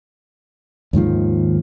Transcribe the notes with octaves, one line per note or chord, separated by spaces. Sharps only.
D#2 G#2 D#3 F3